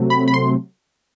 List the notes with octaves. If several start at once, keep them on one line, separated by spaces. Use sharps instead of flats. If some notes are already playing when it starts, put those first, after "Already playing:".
Already playing: C3 F#3 A3 C4
B5
B5
C6